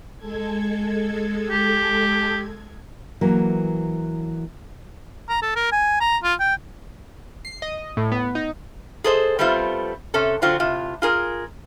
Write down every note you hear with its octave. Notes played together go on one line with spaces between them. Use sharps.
G#3 A4 G#6
G4
E3 F#3 A#3
A#5
A4
A#4
G#5
A#5
F4
G5
C7
D#5
A2
B3
D#4
G#4 A4 C5 D#5
G3 A3 B3 C4 F4
C3 C#4 A4
D3 F#3 C4 F4 F#4
A2 C3 F4
F4 G#4 A#4